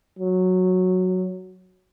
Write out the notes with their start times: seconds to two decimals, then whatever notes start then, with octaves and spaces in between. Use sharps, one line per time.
0.19 F#3